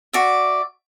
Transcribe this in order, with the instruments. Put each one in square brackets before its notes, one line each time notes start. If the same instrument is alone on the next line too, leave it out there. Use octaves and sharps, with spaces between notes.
[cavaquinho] F#4 D5 E5